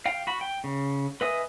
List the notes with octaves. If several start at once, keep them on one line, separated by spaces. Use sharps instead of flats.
F5 G5
F#4 B5
G5
C#3
B4 D#5 E5 G#5 D#6